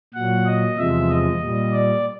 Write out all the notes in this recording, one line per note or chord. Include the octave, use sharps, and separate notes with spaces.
A#2 F#3 F#5
D#5
E2 C3 F3 G#3 E5
D#5
A#2 G3
D5